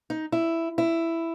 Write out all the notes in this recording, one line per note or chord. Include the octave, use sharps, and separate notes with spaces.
D#4
E4
E4